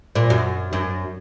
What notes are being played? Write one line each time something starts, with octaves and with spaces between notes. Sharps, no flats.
A#2
F#2
F#2